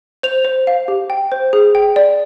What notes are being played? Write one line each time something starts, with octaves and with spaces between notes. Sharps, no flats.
C5 F7
C5
F5
G4
G5
C5
G#4
G5
D5